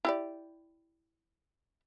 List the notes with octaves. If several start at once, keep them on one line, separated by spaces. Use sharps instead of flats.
E4 G4 D5